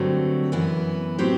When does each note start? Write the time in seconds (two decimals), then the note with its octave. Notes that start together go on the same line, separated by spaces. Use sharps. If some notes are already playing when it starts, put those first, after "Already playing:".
Already playing: G2 D3 F#3 A3 C4
0.52 F#2 E3 B3 E4
1.19 A2 F#3 C4 G4 C5